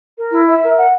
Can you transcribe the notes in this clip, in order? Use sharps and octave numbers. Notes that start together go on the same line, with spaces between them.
A#4
E4
E5
A#4
F#5